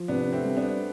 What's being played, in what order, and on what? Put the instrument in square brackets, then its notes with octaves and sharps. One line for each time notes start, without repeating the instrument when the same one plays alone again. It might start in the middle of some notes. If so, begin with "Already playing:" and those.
Already playing: [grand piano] F3
[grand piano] C3 [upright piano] B3 D4
[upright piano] A3 C4
[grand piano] G3
[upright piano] B3 D4